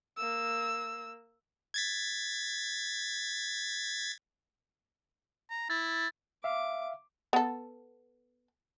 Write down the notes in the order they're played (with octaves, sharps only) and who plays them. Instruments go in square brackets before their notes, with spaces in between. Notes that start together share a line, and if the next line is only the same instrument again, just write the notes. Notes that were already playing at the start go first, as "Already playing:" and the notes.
[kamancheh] A#3 E6
[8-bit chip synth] G#6 A6 B6
[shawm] A#5
[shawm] E4 [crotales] A6
[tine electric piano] E5 F5 [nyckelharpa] D6
[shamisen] B3 A4